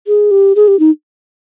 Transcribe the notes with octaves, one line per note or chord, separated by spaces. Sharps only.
G#4
G4
G#4
G4
D#4